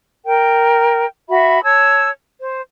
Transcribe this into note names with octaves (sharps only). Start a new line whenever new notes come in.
A#4 G5
F#4 E5 B5
C#5 A5 E6
C5